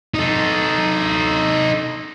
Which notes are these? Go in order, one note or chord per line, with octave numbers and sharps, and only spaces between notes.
D#4 A4